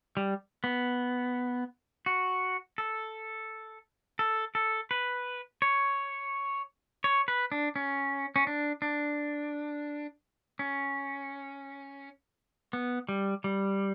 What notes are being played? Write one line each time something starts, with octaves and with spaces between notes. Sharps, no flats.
G3
B3
F#4
A4
A4
A4
B4
C#5
C#5
B4
D4
C#4
C#4
D4
D4
C#4
B3
G3
G3